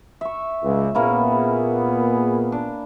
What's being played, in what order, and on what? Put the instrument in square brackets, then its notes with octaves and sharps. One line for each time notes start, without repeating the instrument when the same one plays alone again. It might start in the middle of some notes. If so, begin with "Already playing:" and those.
[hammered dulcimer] E5 C#6
[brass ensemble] C#2
[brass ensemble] A#2 B3 G#4 [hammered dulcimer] A#3 C#4 E4
[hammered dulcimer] D4